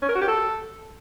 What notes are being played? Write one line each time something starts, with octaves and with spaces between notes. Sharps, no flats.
C#4
A#4
F#4
G4
A4